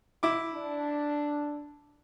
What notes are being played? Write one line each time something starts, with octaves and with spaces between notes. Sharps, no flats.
E4 D6
D4